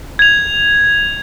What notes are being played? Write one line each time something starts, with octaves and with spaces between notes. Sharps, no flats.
G#6 F7